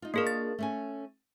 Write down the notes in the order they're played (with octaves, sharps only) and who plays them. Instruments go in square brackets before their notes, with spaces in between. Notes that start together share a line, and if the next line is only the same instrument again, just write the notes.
[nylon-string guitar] D#4 F4
[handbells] A#3 G#4 A#4 [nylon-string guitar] D4 F4 F5
[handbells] A6
[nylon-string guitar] A3 C#4 G#5